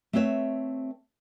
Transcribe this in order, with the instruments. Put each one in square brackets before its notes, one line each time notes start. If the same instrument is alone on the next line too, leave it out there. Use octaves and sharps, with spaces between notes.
[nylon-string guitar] A3 C4 B4 C#5 E5